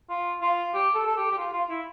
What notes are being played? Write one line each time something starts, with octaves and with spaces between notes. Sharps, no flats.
F4
F4
G4
A4
A4
G4
G4
F4
F4
E4